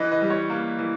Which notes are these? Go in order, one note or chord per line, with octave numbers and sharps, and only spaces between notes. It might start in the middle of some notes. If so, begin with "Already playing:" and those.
Already playing: E3 B4 D#5
B4 D#5
G3
C#5
A#3
E3